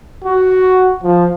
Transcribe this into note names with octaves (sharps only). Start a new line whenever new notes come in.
F#4
F3